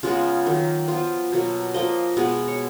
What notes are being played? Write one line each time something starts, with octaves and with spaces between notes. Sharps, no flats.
C#3 G#3 B3 F4
D#3 F#3 A#3
F3 B3 F4
B2 F#3 A#3
F3 A#3 D#5
B2 G#3 B3
C#5